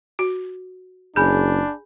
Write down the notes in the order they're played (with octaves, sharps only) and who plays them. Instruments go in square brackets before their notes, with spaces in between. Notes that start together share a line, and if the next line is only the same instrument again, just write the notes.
[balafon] F#4
[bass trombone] F#1 [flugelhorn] D4 [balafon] G#4 [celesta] G#5 B5 G6